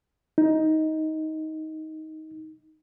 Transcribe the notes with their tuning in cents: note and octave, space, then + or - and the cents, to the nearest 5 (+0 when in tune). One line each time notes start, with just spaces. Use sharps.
D#4 +15